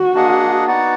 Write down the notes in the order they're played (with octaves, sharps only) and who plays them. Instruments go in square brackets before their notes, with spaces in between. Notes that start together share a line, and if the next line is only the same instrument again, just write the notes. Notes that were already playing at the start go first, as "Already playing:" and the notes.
Already playing: [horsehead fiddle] F#4
[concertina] A#3 D4 G#4 D#5 F#5
B3 D#4 F#4 D5 F#5